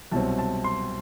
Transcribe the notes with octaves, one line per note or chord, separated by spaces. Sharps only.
C2 B2 F#3 C4 A5
A5
C6